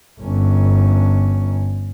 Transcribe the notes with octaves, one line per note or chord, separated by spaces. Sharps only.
G1 C#4